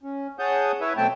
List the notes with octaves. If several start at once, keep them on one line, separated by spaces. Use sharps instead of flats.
C#4
G#4 C#5 F#5 A5 D#6 G6
E4 B4 C#5 E5
B2 F#3 A3 C4 G5 A5